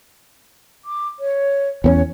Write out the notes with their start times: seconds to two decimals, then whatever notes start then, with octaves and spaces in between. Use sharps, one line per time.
0.85 D6
1.20 C#5
1.84 E2 B3 C#4 C#5